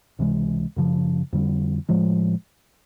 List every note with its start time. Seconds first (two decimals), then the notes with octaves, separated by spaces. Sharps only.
0.19 C#2 C3 E3 G#3
0.76 F#2 C#3 F3
1.33 F2 D3 G3
1.89 A2 F3 G#3